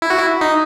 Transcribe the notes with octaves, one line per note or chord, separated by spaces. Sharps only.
E4
F#4
E4
D#4